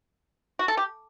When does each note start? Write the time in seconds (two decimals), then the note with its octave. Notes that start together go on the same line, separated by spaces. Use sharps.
0.59 F#4
0.68 A4
0.77 G4